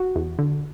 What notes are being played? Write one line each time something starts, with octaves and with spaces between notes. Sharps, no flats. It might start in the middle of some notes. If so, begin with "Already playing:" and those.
Already playing: F#4
E2
D3